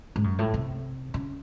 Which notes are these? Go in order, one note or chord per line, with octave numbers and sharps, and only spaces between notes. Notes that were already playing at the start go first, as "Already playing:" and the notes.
G#2
F#2
A2
C3
C#3